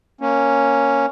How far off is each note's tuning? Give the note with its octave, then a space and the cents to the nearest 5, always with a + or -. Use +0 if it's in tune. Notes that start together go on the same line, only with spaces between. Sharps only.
A#3 +0 C#4 +0